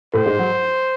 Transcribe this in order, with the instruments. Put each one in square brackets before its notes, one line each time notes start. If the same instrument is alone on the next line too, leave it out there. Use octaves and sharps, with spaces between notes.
[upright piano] A2 A3 [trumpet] C5
[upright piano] G#2 G#3
F#3